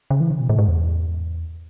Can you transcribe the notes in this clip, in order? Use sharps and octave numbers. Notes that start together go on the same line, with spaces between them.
C#3
E3
C#3
B2
A2
G#2
E2